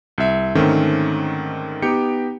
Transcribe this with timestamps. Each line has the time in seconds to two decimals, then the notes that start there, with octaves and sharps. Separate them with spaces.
0.18 C2 E5
0.55 G#2 D3 D#3 A3 C4 C#4
1.82 B3 D#4 G4 G5 C#7